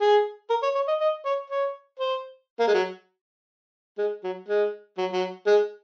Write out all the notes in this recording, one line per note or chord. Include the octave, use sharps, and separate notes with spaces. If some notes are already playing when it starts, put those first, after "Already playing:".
G#4
A#4
C#5
C#5
D#5
D#5
C#5
C#5
C5
A#3
G#3
F#3
G#3
F#3
G#3
F#3
F#3
G#3